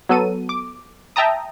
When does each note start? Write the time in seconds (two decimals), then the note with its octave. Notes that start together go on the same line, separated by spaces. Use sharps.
0.09 F#3 B3 A4 D#7
0.49 D6
1.16 E5 G5 A5 A#5 D#6